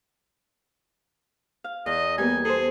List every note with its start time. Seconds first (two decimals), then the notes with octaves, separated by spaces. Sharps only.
1.64 F5
1.86 E2 D#5
2.18 G3 A#3 B3 G#5
2.45 G#4 A4 C5